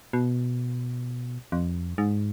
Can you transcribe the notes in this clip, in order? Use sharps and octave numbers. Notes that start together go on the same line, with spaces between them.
B2
F2
G#2